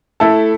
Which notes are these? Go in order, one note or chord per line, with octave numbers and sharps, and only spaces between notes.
A3 E4 A4